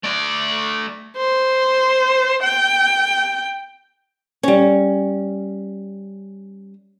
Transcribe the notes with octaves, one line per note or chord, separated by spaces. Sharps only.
A3 D5
C5
G5
G3 C#4